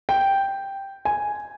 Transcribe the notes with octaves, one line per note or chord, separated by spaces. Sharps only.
G5
G#5